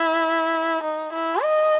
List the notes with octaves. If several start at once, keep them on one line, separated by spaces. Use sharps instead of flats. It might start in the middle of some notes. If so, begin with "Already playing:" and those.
Already playing: E4
D#4
E4
D#5